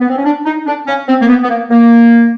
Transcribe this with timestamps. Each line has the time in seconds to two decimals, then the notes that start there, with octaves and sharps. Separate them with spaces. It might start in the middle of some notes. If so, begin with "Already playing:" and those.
0.01 B3
0.09 C4
0.17 C#4
0.25 D4
0.45 D#4
0.66 D4
0.87 C#4
1.08 C4
1.21 A#3
1.28 B3
1.43 B3
1.49 A#3
1.70 A#3